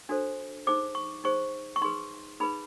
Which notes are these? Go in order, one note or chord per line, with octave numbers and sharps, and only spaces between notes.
D4 F#4 A4 C5
D#4 G#4 C5 D6
C#6
D#4 G#4 C5 C#6
C#6
D#4 G#4 B4 C6
D#4 G#4 B4 B5